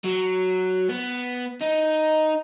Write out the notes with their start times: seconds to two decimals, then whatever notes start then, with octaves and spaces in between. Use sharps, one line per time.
0.04 F#3
0.89 B3
1.62 D#4